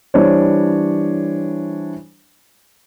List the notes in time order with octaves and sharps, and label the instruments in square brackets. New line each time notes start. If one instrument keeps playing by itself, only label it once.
[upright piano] E3 G3 D4 C5 C#5